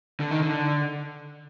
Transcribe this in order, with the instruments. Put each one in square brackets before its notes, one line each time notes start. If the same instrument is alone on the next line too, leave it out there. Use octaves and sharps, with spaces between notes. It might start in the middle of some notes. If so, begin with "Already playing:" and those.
[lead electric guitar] D3
D#3
D3